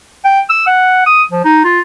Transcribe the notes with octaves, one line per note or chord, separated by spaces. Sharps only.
G5
E6
F#5
D#6
F3
D#4
F4